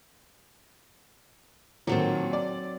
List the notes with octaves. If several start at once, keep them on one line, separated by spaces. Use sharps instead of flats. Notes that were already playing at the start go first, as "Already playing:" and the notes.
A#2 D#3 F#3 C4 A4
D5